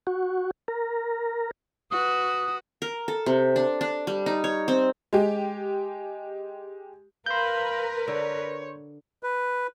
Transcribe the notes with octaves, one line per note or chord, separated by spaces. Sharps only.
F#4
A#4
F#4 B4 D#6
A#4
A4
C3
D4
D4
G3
D#4
C#5
C4
G#3 G4
A#4 B4 F5 B5 C6 G6
D3 C#5
B4